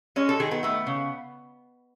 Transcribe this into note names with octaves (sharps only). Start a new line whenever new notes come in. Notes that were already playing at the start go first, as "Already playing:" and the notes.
G#3 C#4
A4
D#3 G#4
B3
A3 B3
C#3